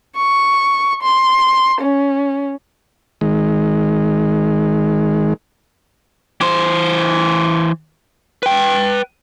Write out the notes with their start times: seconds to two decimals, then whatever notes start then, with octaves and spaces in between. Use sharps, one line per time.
0.16 C#6
1.03 C6
1.81 C#4
3.21 D#3 G#3
6.41 E3 C5
8.43 B4 G5